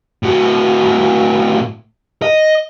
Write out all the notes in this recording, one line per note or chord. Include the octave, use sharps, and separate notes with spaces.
A2 F#4
D#5